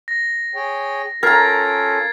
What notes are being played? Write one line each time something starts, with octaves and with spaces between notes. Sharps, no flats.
A#6
G#4 C#5 G5
C#4 F4 A4 A#4 A#5 G#6 A6 C7